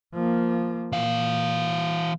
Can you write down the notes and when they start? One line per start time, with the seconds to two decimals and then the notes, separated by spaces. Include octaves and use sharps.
0.14 F3 A#3
0.92 A#2 E3 F5